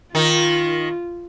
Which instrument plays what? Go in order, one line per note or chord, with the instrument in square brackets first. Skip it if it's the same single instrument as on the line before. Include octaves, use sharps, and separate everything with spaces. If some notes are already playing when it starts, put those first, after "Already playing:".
[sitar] D#3 D#4 [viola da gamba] F4